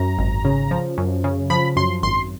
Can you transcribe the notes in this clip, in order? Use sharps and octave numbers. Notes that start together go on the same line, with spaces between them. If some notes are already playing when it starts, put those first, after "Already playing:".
Already playing: F#2 A#5
G#1
C#3
F3
F#2
C#3
F3 B5
F#2 C6
G#1 C6